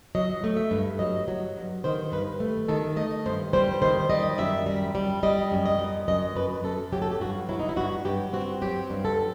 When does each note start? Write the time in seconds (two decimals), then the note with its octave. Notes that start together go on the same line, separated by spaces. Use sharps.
0.15 F#3 D#5
0.44 A3
0.57 E5
0.71 G2
0.99 F#3 D#5
1.28 F#3
1.57 G2
1.84 D#3 C5
2.12 G2 B4
2.40 A3
2.68 D#3 A4
2.96 A3 D#5
3.26 G2 C5
3.53 G3 C5
3.82 D#3 C5
4.10 G3 D#5
4.38 F#2 E5
4.66 G3
4.95 G3
5.23 G3 D#5
5.52 F#2
5.66 D#5
5.79 F#2
6.08 F#2 D#5
6.36 F#2 B4
6.64 F#2 A4
6.92 F#3 G4
7.02 A4
7.11 G4
7.21 G2 F#4
7.49 F#3 E4
7.59 D#4
7.69 E4
7.76 G2 F#4
8.05 G2 G4
8.33 C4 F#4
8.62 F#3 G4
8.90 G2
9.05 A4